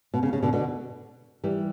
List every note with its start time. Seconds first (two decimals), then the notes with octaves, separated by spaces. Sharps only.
0.14 B2
0.23 C#3
0.33 C#3
0.43 B2 D3
0.53 B2 D3
1.44 E3 G3